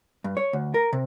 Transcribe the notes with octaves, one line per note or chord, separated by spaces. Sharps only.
G2
C#5
D2
A#4
C3